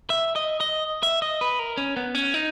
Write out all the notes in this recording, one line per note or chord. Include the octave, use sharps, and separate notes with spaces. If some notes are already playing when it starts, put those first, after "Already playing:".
E5
D#5
D#5
E5
D#5
B4
A#4
C#4
B3
C#4
D#4